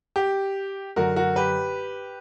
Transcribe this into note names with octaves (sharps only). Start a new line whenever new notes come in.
G4
F#2 D3 F#4 A#4
F#4 A#4
G4 B4